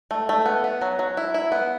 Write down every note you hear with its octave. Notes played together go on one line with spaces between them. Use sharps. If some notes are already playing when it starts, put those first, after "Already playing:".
A3
A3
B3
B3
F#3
F#3
E4
E4
B3